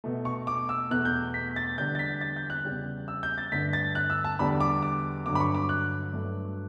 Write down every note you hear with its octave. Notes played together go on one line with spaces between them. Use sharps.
B2 A3
C#6
D6
E6
E2 B2 A3 F#6
G6
B6
A6
E2 D3 G3 G6
A6
B6
A6
G6
F#6
E2 C#3 G3
E6
G6
A6
G2 D3 A3 B6
A6
F#6
E6
A5
E2 D3 G3 B5
D6
D6
G2 D3 F#3 D6
B5
C#6
D6
F#6
G2 F#3 A3